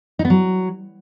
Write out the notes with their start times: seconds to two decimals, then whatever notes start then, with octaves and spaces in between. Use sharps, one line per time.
0.19 D#4
0.25 B3
0.30 F#3